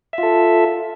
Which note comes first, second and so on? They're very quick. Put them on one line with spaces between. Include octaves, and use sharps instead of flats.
E5 F4 A4